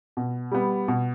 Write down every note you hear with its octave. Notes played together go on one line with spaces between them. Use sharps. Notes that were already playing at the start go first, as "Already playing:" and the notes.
B2
G3 B3
B2